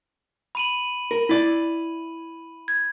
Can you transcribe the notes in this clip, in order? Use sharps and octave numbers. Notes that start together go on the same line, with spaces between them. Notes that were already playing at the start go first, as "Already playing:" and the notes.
B5 D#7 F#7
A#4
E4 D5
G#6